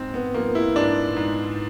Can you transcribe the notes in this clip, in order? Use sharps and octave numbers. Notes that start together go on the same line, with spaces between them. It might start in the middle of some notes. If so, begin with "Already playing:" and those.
Already playing: G#2 C4
B3
F3 A#3
E4
G#2 D4
G#2